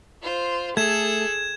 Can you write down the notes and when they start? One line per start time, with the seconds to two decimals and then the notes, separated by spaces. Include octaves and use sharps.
0.23 F4 C5
0.77 A3 G#4 A4 G#6 E7